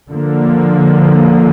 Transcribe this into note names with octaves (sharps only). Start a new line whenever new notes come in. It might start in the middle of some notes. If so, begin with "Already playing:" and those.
D3 F3 A#3